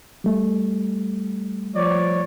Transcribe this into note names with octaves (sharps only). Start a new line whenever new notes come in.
G3 A3
F3 C#5 D5